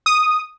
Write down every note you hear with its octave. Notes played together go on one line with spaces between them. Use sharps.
D#6